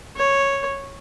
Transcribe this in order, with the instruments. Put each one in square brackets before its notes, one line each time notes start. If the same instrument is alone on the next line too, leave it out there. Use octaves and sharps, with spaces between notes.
[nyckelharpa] C#5